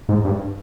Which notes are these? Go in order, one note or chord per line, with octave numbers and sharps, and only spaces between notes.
G#2
G2